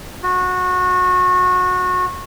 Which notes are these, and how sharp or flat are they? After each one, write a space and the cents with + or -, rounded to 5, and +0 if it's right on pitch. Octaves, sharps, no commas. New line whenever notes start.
F#4 -25